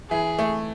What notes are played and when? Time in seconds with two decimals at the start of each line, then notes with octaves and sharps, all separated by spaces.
0.10 E3 G#4
0.39 A3